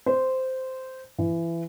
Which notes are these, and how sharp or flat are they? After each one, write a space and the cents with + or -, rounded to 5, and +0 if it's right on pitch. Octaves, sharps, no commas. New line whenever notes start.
C5 -10
E3 +25